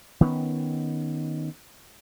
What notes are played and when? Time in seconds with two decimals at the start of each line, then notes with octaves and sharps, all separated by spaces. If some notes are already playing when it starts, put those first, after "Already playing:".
0.21 D#3 B3 C#4